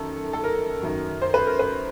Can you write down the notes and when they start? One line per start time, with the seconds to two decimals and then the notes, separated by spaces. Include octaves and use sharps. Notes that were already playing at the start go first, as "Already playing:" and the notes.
Already playing: F#2 D#3 A4
0.33 A4
0.44 A#4
0.82 F#2 D#3 F#3
1.22 C5
1.34 B4
1.47 A#4
1.59 B4